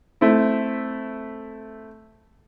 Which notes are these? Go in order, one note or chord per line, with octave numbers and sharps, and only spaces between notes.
A3 C4 E4